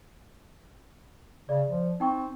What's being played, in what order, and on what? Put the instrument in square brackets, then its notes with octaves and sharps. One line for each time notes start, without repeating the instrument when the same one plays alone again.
[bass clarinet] C#3 [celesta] D5
[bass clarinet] F3
[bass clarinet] C4 [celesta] D#4 G5 C#6